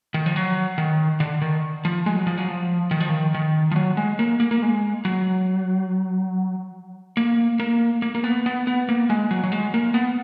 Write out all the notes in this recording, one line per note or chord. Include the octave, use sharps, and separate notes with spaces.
D#3
F3
F#3
D#3
D3
D#3
F3
G#3
F#3
F3
F#3
F3
D#3
F3
D#3
D#3
F3
F#3
G#3
A#3
A#3
A#3
G#3
F#3
A#3
A#3
A#3
A#3
B3
B3
B3
A#3
G#3
F#3
F#3
G#3
A#3
B3